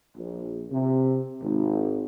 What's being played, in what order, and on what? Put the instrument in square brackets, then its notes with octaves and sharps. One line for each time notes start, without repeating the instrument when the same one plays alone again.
[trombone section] A#1
C3
G#1